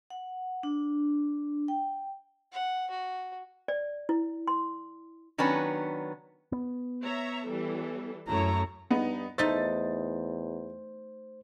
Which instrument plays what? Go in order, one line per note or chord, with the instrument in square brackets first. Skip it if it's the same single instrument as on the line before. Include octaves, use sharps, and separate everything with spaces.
[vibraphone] F#5
D4
G5
[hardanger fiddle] F#5
F#4
[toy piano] D5
E4
C6
[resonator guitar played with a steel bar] D#3 F#3 B3 C#4 D4 B4
[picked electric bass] B3
[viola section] C#5 E5 A#5
E3 G3 A4
[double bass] F#2 A3 [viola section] E4 A4 C#5 [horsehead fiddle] A#5
[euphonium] G2 [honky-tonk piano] B3 D#4
[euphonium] E2 [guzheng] A3 D#4 E5 [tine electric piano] C5 [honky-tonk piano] A6